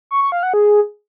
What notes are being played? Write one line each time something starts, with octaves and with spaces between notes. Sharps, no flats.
C#6
C#6
F5
F#5
G#4